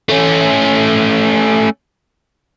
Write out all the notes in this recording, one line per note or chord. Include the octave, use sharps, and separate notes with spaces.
A3 C#4